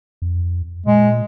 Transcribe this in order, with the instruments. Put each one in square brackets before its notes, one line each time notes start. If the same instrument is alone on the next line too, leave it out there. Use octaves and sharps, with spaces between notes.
[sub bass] F2
[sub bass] A#2 [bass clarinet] G#3